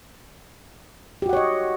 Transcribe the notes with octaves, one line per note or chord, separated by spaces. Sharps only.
F#4 G4 C#5 D#5 F#5